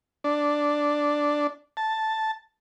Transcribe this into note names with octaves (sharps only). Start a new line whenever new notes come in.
D4
A5